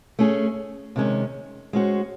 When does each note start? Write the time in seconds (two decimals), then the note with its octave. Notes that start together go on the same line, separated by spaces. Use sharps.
0.19 A3 C#4 G#4
0.96 C3 D#3 G#3 C#4
1.73 G#3 C#4 F#4 C5